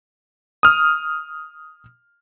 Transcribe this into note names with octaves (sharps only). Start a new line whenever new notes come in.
D#6 F6